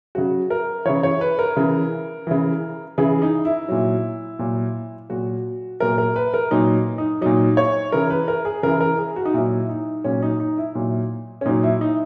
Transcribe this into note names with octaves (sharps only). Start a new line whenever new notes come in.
C#3 F#3 F#4
A#4
C#3 E3 C#5
C#5
B4
A#4
C#3 E3
C#3 E3
C#3 E3 G#4
D#4
E4
A#2 F#3
A#2 F#3
A#2 F#3 F#4
A#2 F#3 A#4
A#4
B4
A#4
A#2 F#3 D#4
D#4
A#2 F#3 D#4
C#5
C#3 E3 A#4
B4
A#4
G#4
C#3 E3 A#4
A#4
G#4
F#4
D#4
A#2 F#3 E4
D#4
A#2 F#3 C#4
D#4
D#4
E4
A#2 F#3
C#4
A#2 F#3 D#4
E4
D#4